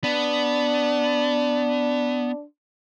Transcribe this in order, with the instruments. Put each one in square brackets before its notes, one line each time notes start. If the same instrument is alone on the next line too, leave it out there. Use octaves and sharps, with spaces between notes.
[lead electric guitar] B3 [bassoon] D4